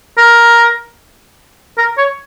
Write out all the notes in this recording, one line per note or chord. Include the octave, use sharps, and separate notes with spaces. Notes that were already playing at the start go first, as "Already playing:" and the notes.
A#4
A#4
C#5